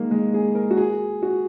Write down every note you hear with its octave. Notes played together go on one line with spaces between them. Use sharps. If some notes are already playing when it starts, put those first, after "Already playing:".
Already playing: D#3 G#3 A#3
G#3
G#4
A#4
F#4
G#4
F#4